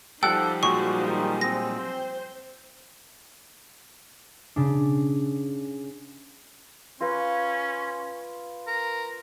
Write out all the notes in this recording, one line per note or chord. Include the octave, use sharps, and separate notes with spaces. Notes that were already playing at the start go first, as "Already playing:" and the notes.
F3 G3 D#4 A4 F#5 G5
A#2 F#3 G#3 F#4 C#6
D#3
C4 A#6
C5
C#3 D4
C#4 F4 B4
A#4